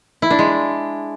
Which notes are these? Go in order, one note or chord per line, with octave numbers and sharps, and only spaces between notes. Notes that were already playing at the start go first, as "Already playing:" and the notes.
E4
D4
G#3